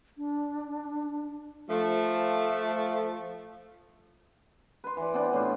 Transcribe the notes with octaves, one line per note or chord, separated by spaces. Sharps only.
D4
F3 A3
B4 C6
E3 D5
B3 C4 D4
A2 E4 F4 C5